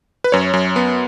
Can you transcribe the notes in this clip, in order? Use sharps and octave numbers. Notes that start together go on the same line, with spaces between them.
B4
F#2 C#5
F#2
B3